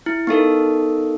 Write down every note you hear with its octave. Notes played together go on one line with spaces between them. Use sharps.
E4
B3 D#4 A4 A#4